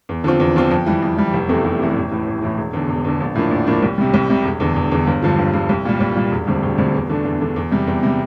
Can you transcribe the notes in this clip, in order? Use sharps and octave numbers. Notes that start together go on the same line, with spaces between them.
E2
D3 F3 C4 F4
E2
D3 F3 C4 F4
F2
E3 G3
F2
E3 G3
F1
E2 C3 E3 A3
F1
E2 C3 E3 A3
A1
A2 E3
A1
A2 E3
E1
E2 D3
E1
E2 D3
A#1
A2 F3 A#3 D4
A#1
A2 F3 A#3 D4
C2
C3 G3
C2
C3 G3
E1
E2 D3
E1
E2 D3
G1
G2 D3 F3
G1
G2 D3 F3
C2
A#2 G3
C2
A#2 G3
E1
D2 D3 G3 C4
E1
D2 D3 G3 C4
E2
D3 A3 D4
E2
D3 A3 D4
E2
C3 G3
E2
C3 G3